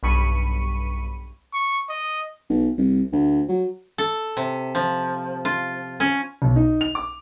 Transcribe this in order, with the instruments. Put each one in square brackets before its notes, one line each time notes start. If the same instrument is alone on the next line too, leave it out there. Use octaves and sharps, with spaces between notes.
[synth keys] B1 G2 B5 C#6 C#7 D#7
[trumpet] C#6
D#5
[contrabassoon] B1
C2
D2
F#3
[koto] A4
C3
F3
F4
C#4
[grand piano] B1
D#4
F7
D6